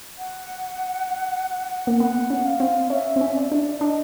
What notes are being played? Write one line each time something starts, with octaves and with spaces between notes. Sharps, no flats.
F#5
A#3
B3 F#5
C#4
F5
C4
C#4 E5
C4
C#4
D5
D4
D4 D#5